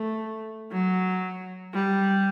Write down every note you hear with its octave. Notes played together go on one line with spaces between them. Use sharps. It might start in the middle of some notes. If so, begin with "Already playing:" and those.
Already playing: A3
F#3
G3